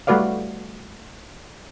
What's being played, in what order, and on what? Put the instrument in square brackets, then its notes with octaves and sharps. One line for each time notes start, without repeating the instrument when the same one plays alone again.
[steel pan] G3 A3 F#4 B4 D5 F5